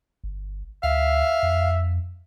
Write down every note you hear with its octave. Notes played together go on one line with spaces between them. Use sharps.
G1
D2 E5 F5
F2